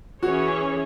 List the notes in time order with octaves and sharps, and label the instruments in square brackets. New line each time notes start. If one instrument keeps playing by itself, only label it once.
[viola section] E3 C#4 G#4 C#5 [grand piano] F#4